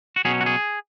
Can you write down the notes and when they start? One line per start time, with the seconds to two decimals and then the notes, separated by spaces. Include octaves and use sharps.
0.16 F#4
0.25 B2 F#3 C#4 G#4
0.41 F#4
0.46 G#4